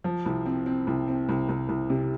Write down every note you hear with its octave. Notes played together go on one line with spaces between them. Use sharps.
F3
C2
C4
C4
C2
C4
C2
C2
C2
C3